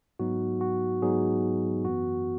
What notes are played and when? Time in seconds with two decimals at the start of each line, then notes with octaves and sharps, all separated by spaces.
0.19 G#2 F#3 B3 D#4 F#4
0.61 F#4
1.02 G#2 F#3 B3 D#4 G#4
1.85 F#2 E3 B3 F#4